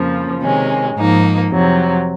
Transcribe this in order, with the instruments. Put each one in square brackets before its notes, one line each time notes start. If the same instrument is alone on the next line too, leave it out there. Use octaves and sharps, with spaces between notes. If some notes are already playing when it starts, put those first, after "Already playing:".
Already playing: [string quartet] F2 C#3 F3 A#3
C3 D#3 G#3 C#4
G#2 F3 A#3 D#4
F2 C3 F#3